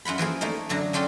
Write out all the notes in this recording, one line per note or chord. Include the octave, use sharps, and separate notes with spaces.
F#2 F4 F#5 B5
E3 F3 A#3 G#4
A3 A#3 D#4
F#2 D3 F#3 A#5
C#4 D4 F4 G4 A4